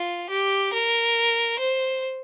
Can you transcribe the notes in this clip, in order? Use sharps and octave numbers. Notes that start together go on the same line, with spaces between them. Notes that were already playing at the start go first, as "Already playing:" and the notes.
Already playing: F4
G4
A#4
C5